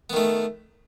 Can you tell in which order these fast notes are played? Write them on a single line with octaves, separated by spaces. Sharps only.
B3 D#3 A3